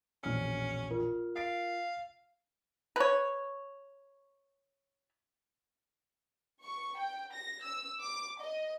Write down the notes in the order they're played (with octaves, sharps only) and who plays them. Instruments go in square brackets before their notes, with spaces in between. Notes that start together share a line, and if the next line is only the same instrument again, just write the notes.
[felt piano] E1 A#1 F6 [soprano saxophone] C#4
[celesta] F4 A#4
[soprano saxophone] F5 [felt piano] A6 C7 D7
[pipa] B4 C#5
[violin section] C#6
G5
A#6
E6
D6
D#5